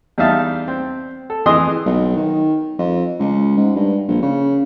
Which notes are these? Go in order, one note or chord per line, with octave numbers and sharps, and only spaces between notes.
E2 G3 D#4 E5 F5 A5
C4
A4
F2 E3 G#4 D#5 C6 D#6
B1
D#3
F2
C#2
G#2
G2
A#1
C#3